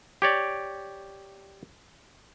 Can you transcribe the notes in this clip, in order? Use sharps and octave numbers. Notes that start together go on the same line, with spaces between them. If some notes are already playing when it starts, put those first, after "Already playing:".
G4 C#5 D5